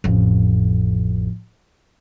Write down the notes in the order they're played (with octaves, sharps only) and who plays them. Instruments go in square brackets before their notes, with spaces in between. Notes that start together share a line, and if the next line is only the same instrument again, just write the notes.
[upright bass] A1 F2